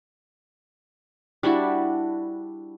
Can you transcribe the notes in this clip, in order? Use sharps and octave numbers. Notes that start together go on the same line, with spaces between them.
G3 D4 E4 F#4